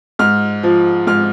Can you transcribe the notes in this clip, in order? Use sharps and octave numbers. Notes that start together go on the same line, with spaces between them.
G#2 F6
F3
G#2 F6